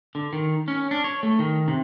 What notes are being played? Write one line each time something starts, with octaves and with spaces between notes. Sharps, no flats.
D3
D#3
C#4
D4
C#5
A3
D#3
C3